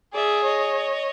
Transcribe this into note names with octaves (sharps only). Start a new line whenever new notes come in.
G#4 D5 E5
C#5 D#5